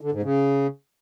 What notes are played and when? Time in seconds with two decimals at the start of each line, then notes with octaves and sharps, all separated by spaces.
0.01 D3
0.12 G#2
0.23 C#3